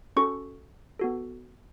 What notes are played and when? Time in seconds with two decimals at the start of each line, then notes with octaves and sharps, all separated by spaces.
0.16 C#4 F#4 A4 C#6
0.99 B3 F#4 A4